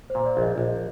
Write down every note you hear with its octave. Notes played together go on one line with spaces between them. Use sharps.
C5
A#2
C5
D5
A#1
D#5
A#1